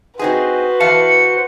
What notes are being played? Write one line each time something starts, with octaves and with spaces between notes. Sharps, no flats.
C4 D#4 F#4 G#4 B4 C5
E3 F5 A5 C#7